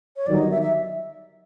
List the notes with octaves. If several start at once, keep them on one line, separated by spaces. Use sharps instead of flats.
C#5
G1 G2 D#3 F#3 D5
D#5
E5
E5